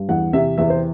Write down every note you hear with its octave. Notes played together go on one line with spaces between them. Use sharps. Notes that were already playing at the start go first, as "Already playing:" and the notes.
Already playing: G2
E2 F#5
C3 E5
E2 E5
C5